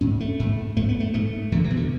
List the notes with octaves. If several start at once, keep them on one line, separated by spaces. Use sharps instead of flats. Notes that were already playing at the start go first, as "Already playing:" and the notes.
G#2 C#4
A3
G#2
G#2 A3
B3
A3
G#2 A3
E2 D3
E3
B2
D3